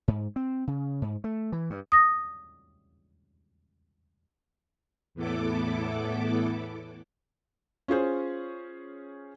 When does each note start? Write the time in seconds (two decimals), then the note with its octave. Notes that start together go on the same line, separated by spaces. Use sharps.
0.08 G#2
0.36 C4
0.67 C#3
1.02 G#2
1.24 A3
1.52 E3
1.70 G2
1.92 D#6 A#6
5.15 E2 A2 B3 E4 A4 D6
7.88 C#4 F4 G#4 C5